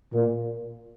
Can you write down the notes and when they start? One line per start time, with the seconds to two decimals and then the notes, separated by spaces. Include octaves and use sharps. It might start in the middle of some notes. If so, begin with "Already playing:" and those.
0.14 A#2